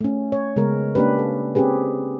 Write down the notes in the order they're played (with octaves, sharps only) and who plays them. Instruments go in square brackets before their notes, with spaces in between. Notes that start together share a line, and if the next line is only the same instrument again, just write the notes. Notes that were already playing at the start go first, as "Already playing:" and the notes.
[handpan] A3 C#4
C#5
C#3 G#3 B3 A#4
A#3 C#4 D4 G4 B4
A4
C4 C#4 G4 G#4 B4